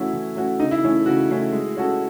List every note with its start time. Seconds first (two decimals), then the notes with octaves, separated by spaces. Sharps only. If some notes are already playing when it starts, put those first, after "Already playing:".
Already playing: E3 A3 C#4 E4 F#4
0.13 E3
0.36 A3 C#4 F#4
0.60 C#3 D#4
0.71 E4
0.83 E3 A3 C#4 E4
1.06 C#3 F#4
1.30 E3 A3 C#4 E4
1.52 G#3
1.77 C#4 F#4 A4